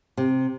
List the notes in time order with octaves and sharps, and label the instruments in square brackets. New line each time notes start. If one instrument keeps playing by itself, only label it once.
[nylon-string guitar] C3